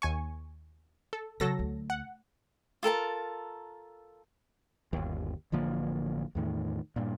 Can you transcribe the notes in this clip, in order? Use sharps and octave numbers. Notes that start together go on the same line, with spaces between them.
D#2 G#5 C#6
A4
C#3 F#3 A4 A#6
D2
F#5
F4 A4 A#4 A5
G1 D#2
A1 D3 F3 A#3
E2 A2 D#3
G2 A#2